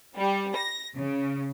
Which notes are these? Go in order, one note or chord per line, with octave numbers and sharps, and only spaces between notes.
G3
A#6
C#3